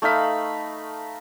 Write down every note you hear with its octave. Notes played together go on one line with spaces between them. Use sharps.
A3 D#4 F5 B5